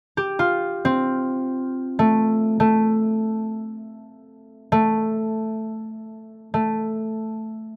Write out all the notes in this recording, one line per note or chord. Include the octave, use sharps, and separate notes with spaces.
G4
F4
C4
A3
A3
A3
A3